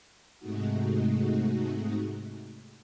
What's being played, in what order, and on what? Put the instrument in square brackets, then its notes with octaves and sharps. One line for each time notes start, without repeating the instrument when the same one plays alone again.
[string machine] G#2 C3 G#3 A3 D#4 F#4